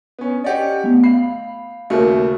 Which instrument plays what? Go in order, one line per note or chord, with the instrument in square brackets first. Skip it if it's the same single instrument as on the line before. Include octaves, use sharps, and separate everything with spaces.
[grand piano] B3 C#4
[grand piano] C#4 G4 [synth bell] D5 D#5 F#5
[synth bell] A3 B3
[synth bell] F5 B5 [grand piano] C7
[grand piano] D#2 C#3 A3 [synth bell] F#4 A#4